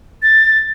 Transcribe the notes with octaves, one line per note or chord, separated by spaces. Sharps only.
A6